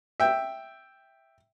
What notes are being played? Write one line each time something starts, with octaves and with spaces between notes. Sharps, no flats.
E5 G5